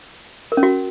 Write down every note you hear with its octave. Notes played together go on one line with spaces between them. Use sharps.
A#4
C#4
F#4